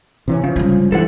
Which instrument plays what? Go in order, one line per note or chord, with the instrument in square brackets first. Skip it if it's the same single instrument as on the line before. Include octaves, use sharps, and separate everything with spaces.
[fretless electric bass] C3 E3 C#4
[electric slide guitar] C#3 [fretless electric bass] F3
[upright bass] G3 G#3
[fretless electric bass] G2 E3 [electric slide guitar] A4 C5 F#5